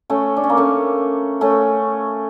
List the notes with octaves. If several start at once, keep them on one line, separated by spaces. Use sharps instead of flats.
A3 C#4
D4
C#4
A#3
A3 C#4
A3 C#4